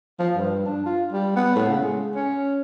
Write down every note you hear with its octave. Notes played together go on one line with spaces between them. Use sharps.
F3
G2
D4
F4
G3
B3
A2
C#3
G#3
C#4